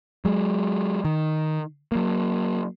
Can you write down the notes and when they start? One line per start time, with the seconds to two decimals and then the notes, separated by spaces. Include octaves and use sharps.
0.25 F#3 G#3
1.05 D#3
1.92 F#3 A#3